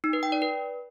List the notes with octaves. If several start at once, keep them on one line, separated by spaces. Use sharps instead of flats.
D#4
B4
G5
D5
B4